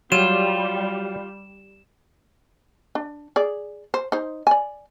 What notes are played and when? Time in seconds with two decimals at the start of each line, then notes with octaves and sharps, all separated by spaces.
0.12 F#3 G3 F4 E7
2.95 D4
3.36 G#4 D5
3.94 C5
4.12 D#4 C5
4.47 D5 G#5